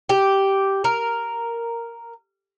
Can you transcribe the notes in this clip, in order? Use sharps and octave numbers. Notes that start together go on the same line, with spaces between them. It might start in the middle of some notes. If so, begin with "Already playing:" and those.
G4
A#4